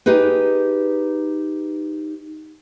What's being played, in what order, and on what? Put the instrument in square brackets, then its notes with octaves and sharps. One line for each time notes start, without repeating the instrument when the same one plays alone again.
[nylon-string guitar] D#4 G4 G#4 B4